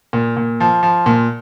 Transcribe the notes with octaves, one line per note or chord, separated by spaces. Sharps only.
A#2
A#2
F3
F3
A#2